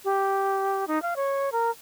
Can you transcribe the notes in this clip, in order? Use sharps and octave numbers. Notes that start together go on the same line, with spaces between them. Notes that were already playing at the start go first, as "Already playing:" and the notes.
G4
D#4
F5
C#5
A#4